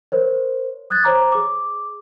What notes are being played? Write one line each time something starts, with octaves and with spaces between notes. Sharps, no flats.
A#4 C5 C#5
D#6 F#6 G#6 A6
C5 C#5 A#5 D6
G#4 D6